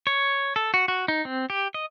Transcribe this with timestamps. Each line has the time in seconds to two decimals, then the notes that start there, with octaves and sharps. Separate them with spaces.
0.07 C#5
0.56 A4
0.74 F#4
0.88 F#4
1.08 D#4
1.25 C4
1.50 G4
1.74 D#5